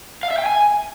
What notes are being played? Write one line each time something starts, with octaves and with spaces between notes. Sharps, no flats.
F5
E5
G5
G#5